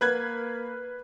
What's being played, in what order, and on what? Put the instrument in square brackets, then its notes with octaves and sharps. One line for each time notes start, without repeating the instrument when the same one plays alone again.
[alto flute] A#3 [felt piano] B4 F#6 G#6